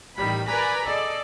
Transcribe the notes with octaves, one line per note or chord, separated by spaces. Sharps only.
A1 D#3 G3 B5
A#4 B4 D5 G#5 A#5 B5
G#4 A4 D5 D#5